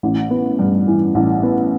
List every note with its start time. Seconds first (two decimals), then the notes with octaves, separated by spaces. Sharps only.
0.03 A1
0.31 B3
0.59 G2
0.87 E3
1.15 A1
1.43 B3